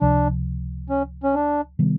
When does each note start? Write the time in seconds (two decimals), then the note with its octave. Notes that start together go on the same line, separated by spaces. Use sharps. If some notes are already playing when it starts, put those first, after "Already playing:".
0.01 C#2 C3 F3 D4
0.89 C#4
1.23 C#4
1.35 D4
1.79 C3 D#3 G3 B3